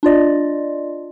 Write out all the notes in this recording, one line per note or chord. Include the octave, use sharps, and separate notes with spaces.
D4 F4 D5 D#5